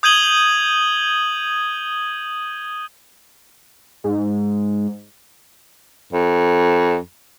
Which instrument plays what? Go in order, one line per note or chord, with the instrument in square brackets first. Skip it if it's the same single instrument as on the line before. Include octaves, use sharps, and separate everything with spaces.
[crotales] D#6 G6 G#6 D#7 F#7 G7
[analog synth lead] G#2
[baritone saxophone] F2